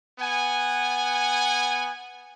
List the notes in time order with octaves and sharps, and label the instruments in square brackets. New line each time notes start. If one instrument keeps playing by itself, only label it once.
[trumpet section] B3 F#5 G#5